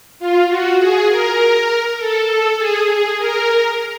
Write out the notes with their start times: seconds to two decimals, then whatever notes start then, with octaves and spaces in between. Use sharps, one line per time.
0.20 F4
0.49 F#4
0.79 G#4
1.09 A#4
1.99 A4
2.29 A4
2.58 G#4
2.89 G#4
3.18 A#4